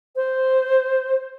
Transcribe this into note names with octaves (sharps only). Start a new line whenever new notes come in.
C5